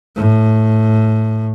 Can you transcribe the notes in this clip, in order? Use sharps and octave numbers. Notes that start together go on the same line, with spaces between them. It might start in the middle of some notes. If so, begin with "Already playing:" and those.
A2